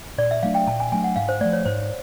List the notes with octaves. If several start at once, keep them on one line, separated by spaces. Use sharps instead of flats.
A#2 D5
E5
F#3 A3 D4 F5
G5
A#2 A5
G#5
F#3 A3 D4 G#5
F#5
G#2 F5
C5
F3 A3 D5
C#5
G#2 C5